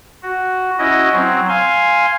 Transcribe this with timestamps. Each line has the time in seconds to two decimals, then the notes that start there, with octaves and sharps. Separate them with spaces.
0.22 F#4
0.79 C#4 E4 F#4 D#5
1.13 F#3 C4
1.49 F5 G#5 C6